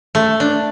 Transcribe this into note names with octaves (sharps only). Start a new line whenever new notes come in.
A3
D4